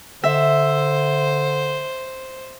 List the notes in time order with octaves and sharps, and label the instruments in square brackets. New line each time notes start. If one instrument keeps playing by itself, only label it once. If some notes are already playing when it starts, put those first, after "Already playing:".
[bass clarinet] D3 [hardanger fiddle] C5 [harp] E5